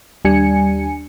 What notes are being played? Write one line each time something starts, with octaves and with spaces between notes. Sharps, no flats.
D#2 G3 D4 G#5 C#7